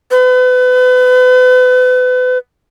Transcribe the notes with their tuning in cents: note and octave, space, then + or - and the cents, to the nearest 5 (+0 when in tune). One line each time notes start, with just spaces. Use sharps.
B4 +35